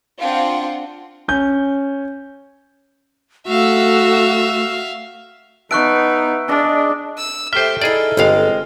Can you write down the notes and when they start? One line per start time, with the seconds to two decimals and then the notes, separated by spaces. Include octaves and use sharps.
0.20 C4 D4 F4 F#5
1.28 C#4 G6
3.48 A3 F#4 E5 F5 E6
5.71 B3 D#4 E5 A5 C#6 F#6 D7
6.48 D4 G#4 D5 D#5
7.17 E6
7.53 A3 G4 C5 E5 F6
7.81 D#4 E4 G#4 A4 D5
8.17 G1 G#3 C4 F5